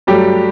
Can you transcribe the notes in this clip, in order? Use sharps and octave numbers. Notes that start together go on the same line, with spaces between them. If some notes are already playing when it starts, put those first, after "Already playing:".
G2 F#3 G3 A3 G4